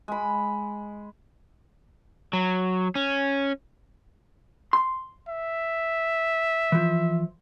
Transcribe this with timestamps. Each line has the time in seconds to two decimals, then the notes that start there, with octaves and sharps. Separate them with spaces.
0.08 G#3 B5
2.33 F#3
2.95 C#4
4.73 C6
5.29 E5
6.72 E3 F3